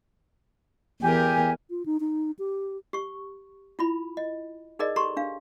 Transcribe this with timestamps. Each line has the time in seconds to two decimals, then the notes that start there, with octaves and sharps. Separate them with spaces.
1.02 E2 G4 A#4 G#5
1.70 F4
1.86 D#4
2.00 D#4
2.39 G4
2.93 G4 C#6
3.79 E4 F4 B5
4.17 D#5
4.79 D#4 G#4 A#4 D5 D#5
4.96 G4 A4 A#5 C6 C#6
5.17 D4 F5